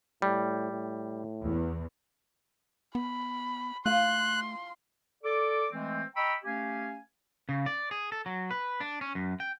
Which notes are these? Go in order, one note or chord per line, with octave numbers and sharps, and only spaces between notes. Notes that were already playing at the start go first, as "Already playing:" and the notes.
A2 G3
A2
E2
B3 B5
A3 F4 C6 F#6
A4 D5 D6
E3 G#3 A3 C4
D#5 G5 A#5 B5 C#6 E6
A3 C#4 G4 F5 G#5
C#3
D5
G#4
A4
F#3
B4
D4
C#4
F#2
G5